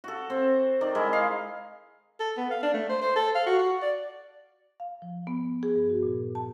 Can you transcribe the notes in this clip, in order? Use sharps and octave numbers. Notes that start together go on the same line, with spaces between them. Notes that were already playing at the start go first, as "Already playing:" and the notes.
F#4 A4
C4
D#3 D5
G#3 E4 A#4 D#5
F5
A4
B3
F5
D4
A3
C5
C5
A4
F5
F#4
F#4
D5
F5
F3
B3
G#4
G2
F#4
A#2
A5